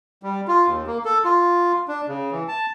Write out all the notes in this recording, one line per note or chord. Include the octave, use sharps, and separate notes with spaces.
G3
F4
D#2
A#3
A4
F4
D4
C#3
E3
A5